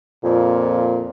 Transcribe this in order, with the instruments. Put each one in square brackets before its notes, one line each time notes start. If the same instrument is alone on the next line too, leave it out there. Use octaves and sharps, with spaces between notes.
[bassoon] F2 [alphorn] A#2